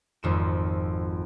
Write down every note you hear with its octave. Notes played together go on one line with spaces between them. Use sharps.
G#1 F2 E7